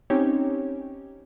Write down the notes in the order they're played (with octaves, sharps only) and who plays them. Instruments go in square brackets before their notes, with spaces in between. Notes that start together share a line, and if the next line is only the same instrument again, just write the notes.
[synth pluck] C4 C#4 D#4 G4 C#5